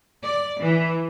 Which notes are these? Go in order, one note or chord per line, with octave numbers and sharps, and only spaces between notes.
D5
E3